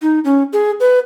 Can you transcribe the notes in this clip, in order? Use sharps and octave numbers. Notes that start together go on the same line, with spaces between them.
D#4
C#4
G#4
B4